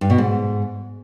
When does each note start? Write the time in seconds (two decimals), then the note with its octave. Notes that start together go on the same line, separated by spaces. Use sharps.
0.01 G2
0.10 B2
0.18 G#2